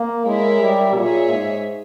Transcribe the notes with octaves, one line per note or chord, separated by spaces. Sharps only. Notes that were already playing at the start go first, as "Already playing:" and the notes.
Already playing: A#3
G#3 E4 A#4 C#5 E5
G3
A#2 G#4 C#5 E5
G#2